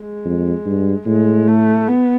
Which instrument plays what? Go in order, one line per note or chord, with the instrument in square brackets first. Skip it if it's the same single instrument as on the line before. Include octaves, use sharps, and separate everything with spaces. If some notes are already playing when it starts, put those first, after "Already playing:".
Already playing: [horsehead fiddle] G#3
[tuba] F2
G2
[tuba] A2 [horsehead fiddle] G#3
[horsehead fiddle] A3
B3